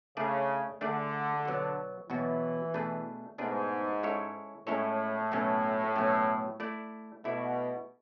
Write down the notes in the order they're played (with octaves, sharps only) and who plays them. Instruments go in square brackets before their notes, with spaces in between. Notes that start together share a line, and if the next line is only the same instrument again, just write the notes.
[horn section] C#3 [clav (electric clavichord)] A3 D4 G#4 D5
[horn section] D3 [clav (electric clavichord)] A3 D4 G#4 D5
[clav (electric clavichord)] B2 F#3 B3 F#4
[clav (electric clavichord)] B2 F#3 B3 F#4 [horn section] E3
[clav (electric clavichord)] B2 A3 D4 G#4 B4
[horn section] G#2 [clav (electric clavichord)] B2 A3 D4 G#4 B4
[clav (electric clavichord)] G#3 C#4 E4 A4 C#5
[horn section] A2 [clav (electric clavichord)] G#3 C#4 E4 A4 C#5
[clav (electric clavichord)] B2 F#3 A3 C#4
B2 F#3 A3 C#4
A3 E4 A4 D5
[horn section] B2 [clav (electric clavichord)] A3 E4 A4 D5